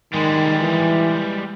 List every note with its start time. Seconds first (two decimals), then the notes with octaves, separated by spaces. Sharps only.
0.13 D#3 G3 G#3
0.62 E3